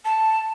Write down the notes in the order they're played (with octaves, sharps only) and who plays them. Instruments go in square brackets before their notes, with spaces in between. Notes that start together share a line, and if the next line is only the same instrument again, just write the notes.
[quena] A5